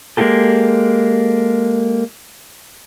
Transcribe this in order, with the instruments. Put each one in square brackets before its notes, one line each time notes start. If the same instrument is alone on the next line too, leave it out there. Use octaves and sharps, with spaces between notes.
[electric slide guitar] G#3 A#3 D#4 F4 G4 A4